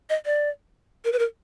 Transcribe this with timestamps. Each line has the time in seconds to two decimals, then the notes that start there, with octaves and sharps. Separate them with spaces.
0.10 D#5
0.26 D5
1.05 A#4
1.13 B4
1.19 A#4